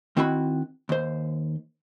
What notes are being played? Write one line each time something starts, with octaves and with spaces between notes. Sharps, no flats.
D#3 C4 E4 F#4 G5 B5
D#2 C5